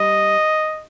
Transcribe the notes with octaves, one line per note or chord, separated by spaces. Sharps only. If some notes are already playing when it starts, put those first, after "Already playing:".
Already playing: G3 D#5